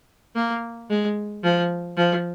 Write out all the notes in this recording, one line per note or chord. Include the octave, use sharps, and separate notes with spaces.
A#3
G#3
F3
F3